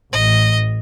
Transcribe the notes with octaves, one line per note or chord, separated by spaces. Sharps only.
A1 D#5